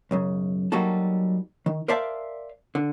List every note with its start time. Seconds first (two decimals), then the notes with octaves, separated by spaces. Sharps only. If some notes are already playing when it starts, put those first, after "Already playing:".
0.11 B1 F#2 C#3
0.72 F#3 G3 A#3 D#4 F#4 A4
1.66 D#3
1.88 A#4 C5 D5 E5 F5 A5
2.75 D3